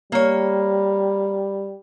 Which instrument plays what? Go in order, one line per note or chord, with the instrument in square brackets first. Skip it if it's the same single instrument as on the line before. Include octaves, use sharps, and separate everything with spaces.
[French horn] G3 [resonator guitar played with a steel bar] A#3 C#5